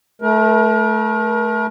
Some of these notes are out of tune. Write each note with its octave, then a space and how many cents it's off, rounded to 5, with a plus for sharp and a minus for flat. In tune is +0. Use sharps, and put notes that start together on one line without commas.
A3 -15 A#4 +35